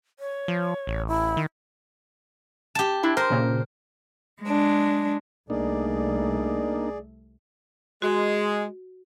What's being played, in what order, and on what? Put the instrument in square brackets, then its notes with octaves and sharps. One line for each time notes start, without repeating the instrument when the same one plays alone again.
[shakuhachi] C#5
[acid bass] F3
A1
[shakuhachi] E4
[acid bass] D#3
[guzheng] G4 A5
[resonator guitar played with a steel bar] D4 E4 G5
[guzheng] A#4 [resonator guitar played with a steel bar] C5
[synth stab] A#2 C#3
[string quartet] G#3 D4
[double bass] C2 A3 [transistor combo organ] A#3 D4 D#4 [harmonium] G#4 D5
[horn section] G#3 [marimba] F#4